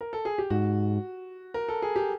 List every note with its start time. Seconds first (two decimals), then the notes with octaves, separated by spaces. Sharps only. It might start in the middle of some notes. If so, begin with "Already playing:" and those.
0.01 A#4
0.13 A4
0.25 G#4
0.38 G4
0.50 G#2 F#4
1.54 A#4
1.69 A4
1.82 G#4
1.96 G4